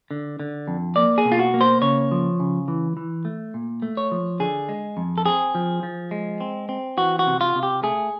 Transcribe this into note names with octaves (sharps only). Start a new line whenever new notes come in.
D3
D3
F2
A#3 D5
G#4
B2
F4
F#4
A#3
C5
C#3 C#5
F3
C#3
E3
E3
A3
A#2
A3
C#5
F3
D3 G#4
G#3
F2
A4
C4 G#4
F3
F3
G#3
C4
C4
E3 F#4
F#4
C3
F4
C3
G4
A3 G#4